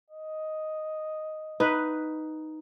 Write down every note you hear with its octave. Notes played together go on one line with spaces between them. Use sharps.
D#5
D#4 B4